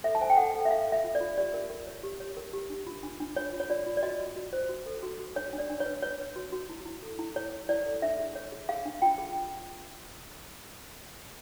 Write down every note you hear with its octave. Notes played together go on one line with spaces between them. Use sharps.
A4 E5
A5
C5 G#5
G5
A4 F#5
A4
E5
A4 F5
A4 E5
F4
D5
F4
G4 D5
A#4
A#4
C#5
G4
C#5
A#4
G4
D4
F4
D4
D4
F4 C#5
F4
C#5
F4 D5
F4
D5
F#4 D#5
F#4
F#4
C5
F#4
A4
F#4
F#4
D4 C#5
D4
D5
D4
C#5
B4
B4 C#5
B4
F#4
F#4
E4
E4
A4
E4
E4 C#5
E4
E4 D5
A4
D4 E5
G#4
C#5
G#4
G#4 F5
D4
F4 G5
G#4